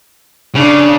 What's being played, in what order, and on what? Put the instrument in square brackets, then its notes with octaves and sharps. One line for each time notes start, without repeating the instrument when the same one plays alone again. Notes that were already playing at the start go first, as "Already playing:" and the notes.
[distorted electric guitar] C#3 [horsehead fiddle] D4